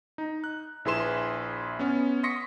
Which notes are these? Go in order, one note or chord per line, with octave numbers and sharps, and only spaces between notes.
D#4
F#6
A#1 E4 G#4 B4 C6 E7
B3 C#4
C6 C#6 D#6 A#6 B6 C#7